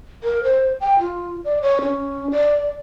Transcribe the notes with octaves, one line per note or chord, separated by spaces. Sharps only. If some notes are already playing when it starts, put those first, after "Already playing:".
A#4
C5
G5
F4
D5
C#5
C#4
D5